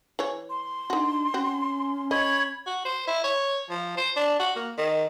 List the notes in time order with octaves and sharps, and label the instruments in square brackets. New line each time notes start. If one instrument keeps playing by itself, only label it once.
[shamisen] E3 C#5
[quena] C6
[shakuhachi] D4 [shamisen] D#4 F#4
[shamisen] C4 F#4 [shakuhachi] C#4
[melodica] C#5 B5 [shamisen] D#5 [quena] G#6
[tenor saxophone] F#4
C5
E4
C#5
F3
C5
D4
F#4
A#3
D#3